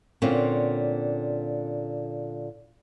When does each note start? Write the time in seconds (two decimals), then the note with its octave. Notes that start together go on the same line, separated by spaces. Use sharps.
0.22 A#2 D3 A#3 C4 C#4